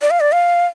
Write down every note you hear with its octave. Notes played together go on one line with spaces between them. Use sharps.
D5
F5
D5
F5